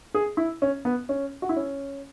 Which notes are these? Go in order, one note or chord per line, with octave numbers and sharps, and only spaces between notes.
G#4
E4
C#4
B3
C#4
F#4
E4
C#4